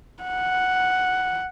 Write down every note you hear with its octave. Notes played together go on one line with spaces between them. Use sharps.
F#5